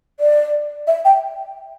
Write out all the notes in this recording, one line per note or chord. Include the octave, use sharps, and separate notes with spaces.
D5
E5
G5